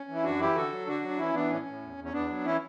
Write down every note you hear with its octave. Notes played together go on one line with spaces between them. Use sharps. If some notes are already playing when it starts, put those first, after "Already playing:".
Already playing: C#4
E3
E4
F#2 D4 F#4
E3 E4 G4
D3 F#4 A4
F#3
D3 D4 F#4
F#3 D4
E3 C#4 E4
E3 B3 D4
A2 C#4
A2
E2
E2
C#4
E2 B3 D4
F#3
E3 C#4 E4